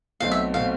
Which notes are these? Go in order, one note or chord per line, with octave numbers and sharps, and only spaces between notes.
B1 B2 A3 C4 F5
E5
B2 A3 C4 F5